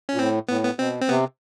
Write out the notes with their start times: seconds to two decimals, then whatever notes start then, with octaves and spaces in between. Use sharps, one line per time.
0.09 A#2 C#4
0.18 A2 C4
0.49 A2 B3
0.64 B3
0.79 B2 C4
1.01 C4
1.09 C3 B3